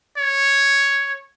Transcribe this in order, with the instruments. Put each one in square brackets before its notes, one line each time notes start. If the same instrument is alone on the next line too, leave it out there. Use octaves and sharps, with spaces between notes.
[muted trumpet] C#5